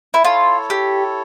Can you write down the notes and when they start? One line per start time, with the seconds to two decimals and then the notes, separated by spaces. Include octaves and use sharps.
0.14 E4
0.24 E4 F4 A4 C#5
0.70 G4